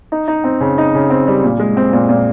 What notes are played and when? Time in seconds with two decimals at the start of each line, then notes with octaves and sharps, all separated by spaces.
0.12 D#4
0.28 D#4
0.44 C4
0.61 C#3
0.78 D#4
0.95 C#3
1.10 C4
1.28 G3
1.43 A#2
1.60 G#3
1.77 C4
1.93 A#2
2.09 A#2